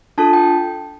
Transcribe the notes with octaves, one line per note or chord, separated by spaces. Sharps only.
D4 F4 A4 A5
G5